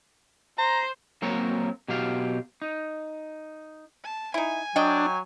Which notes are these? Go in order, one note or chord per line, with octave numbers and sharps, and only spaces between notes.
C5 A#5
F#3 A#3 C4 F#4 A#4 C#5
B2 F#3 G4 F5
D#4
A5
D#4 E4 G#5
F#3 D4 D#5 G5